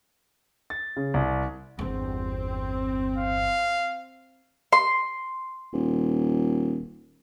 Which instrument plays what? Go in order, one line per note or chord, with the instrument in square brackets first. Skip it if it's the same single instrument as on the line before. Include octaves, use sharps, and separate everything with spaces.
[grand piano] A6
C#3
C2
[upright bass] G1 E2 [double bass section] C4
[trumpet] F5
[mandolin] C6
[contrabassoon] D#1